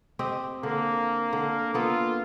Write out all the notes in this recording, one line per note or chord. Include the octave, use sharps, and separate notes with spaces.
C4 G4 D#5
D3 A#3
D3
A#3 B3 F4 A4